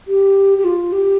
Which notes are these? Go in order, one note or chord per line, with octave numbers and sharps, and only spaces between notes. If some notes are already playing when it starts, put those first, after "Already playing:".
G4
G4
F4
G4